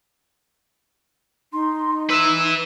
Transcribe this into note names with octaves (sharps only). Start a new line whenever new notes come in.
D#4 C6
B4 E5 E6